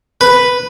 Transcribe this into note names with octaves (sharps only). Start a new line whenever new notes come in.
B4